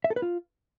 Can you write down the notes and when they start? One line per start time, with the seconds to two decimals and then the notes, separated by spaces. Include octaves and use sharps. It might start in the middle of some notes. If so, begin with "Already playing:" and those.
0.04 E5
0.10 A4
0.16 B4
0.22 F4